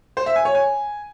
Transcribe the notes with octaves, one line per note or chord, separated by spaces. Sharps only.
C5
E5
G#5
C#5
G#5